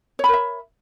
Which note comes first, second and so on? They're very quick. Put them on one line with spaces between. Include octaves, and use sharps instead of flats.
C#5 B5 A#4 E5